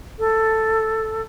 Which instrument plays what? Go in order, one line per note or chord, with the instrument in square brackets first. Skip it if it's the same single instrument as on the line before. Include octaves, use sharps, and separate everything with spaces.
[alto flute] A4